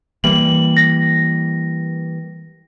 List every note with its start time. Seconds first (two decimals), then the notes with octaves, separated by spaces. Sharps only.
0.24 E3 G3 A#3 F#7
0.77 A#6